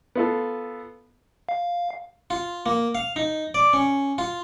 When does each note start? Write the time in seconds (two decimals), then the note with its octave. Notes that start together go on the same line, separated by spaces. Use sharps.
0.15 B3 F4 A4
1.49 F5
2.30 F4
2.66 A#3
2.95 F5
3.16 D#4
3.54 D5
3.73 C#4
4.18 F4